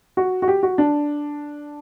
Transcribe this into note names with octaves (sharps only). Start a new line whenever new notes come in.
F#4
F#4
G4
F#4
D4